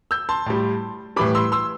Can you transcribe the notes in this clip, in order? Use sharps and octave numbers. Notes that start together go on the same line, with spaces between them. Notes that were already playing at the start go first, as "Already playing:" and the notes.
E6 G6
A5 C6
A2 G3
A2 E3 G3 B5 D6
C6 E6
C6 E6